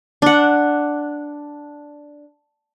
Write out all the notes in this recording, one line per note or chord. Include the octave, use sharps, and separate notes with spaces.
D4 F#5